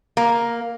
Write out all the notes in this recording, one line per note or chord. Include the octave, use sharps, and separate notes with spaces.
A#3